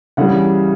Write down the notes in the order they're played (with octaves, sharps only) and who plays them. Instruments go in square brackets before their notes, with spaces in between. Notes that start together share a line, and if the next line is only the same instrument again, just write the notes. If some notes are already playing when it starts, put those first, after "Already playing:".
[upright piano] C#3 E3 G3 F#5